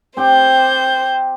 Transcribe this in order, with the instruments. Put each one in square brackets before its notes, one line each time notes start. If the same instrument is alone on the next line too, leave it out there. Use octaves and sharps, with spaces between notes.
[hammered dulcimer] C4 G4 G5 [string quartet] C5 G6